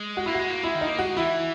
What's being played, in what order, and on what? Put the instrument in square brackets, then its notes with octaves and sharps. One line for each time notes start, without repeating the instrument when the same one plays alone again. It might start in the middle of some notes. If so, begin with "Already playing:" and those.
Already playing: [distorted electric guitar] G#3
[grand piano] F#4
[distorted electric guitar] A#3 [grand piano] E4
[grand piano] F#4
[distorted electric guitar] G#3
A#3
[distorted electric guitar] G#3 [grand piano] E4
[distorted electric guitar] D#3
[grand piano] D#4
[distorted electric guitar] A#3
[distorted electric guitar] G#3 [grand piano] F#4
[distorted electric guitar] E3 [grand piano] E4